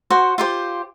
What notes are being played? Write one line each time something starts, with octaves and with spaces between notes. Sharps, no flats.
F#4 C5 F#5
F4 G4 C5